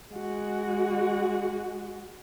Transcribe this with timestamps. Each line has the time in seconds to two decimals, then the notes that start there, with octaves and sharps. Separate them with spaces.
0.12 G#3 F#4